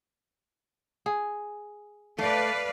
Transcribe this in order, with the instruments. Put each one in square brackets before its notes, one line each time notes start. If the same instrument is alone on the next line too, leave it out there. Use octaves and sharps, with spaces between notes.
[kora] G#4
[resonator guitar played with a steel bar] A3 [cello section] B4 D5 F5